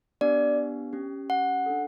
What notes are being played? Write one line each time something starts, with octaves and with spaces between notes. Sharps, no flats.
B3 D4 G4 D5
C#4 G4
F#5
D4 A4